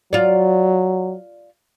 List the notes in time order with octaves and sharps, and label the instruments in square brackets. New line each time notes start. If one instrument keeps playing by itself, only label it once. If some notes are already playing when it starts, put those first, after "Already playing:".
[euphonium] F#3 [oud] F4 D5